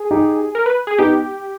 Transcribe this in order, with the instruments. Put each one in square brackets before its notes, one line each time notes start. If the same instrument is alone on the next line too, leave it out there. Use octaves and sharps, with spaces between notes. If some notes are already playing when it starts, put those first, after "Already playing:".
Already playing: [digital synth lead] G#4
[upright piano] D#4 G4
[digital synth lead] A#4
B4
G#4
[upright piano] B3 D#4 [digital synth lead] G4